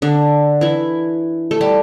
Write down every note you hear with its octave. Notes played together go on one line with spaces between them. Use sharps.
D3 D4
E3 E4
A3 A4
G3 G4